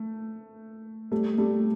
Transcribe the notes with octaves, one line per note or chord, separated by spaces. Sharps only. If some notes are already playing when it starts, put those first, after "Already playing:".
Already playing: A3
G3 A3
G3 A3